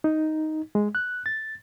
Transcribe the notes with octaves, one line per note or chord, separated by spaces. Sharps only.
D#4
G#3
F#6
A6